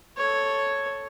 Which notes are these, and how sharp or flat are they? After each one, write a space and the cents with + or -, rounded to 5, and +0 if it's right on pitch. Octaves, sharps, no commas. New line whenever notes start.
A4 +0 C#5 +0